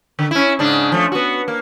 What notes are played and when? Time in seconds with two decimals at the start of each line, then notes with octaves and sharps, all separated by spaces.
0.19 D3
0.31 C#4 E4
0.59 G#2 C#3 D4
0.92 F3 A3
1.12 B3 F#4
1.48 A#3